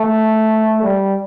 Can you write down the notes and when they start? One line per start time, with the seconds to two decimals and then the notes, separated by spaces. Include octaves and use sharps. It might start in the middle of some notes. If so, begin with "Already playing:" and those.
Already playing: A3
0.83 G3